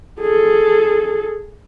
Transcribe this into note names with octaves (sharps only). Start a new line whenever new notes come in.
G#4 A4